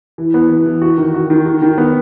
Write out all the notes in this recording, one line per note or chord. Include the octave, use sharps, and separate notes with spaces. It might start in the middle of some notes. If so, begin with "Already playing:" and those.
E3
B3
E3
E3
F#4
D#3
F#4
D#3
D#3
D#3
B3